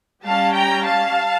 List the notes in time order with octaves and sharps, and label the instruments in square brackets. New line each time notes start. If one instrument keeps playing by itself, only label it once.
[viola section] G3 C#4 F5 A5
G5 A#5
F5 A5